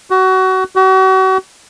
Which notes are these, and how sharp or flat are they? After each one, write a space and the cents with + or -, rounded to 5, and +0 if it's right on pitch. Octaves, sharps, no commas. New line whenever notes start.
F#4 +25
F#4 +40